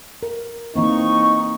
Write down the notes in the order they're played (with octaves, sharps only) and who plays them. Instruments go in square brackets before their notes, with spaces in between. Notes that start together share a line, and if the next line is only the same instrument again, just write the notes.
[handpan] A#4
[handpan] E3 A#3 C4 [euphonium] D#4 [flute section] C#6